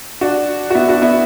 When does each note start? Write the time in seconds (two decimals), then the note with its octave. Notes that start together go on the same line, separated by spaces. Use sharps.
0.21 D4 F#4
0.70 F#4
0.75 B3 E4
0.88 D4 F#4
1.02 B3 E4